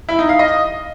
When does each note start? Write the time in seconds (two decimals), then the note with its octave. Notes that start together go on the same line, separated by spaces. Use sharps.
0.09 E4
0.19 D#4
0.29 F5
0.39 D#5